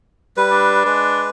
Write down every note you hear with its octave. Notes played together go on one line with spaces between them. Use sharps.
G3 B4
D4
G#3 B4